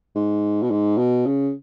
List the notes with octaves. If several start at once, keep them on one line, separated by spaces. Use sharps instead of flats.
G#2
B2
G#2
B2
C#3